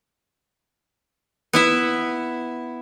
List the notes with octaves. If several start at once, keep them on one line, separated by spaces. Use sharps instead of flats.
B3 E4 E5